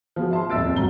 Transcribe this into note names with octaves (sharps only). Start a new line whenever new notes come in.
F3 B3 F#4 G#4
E5 A5 C6
D#1 F2 E5 E6 A6 D7
G1 D2 G2 F#3 A#5 G7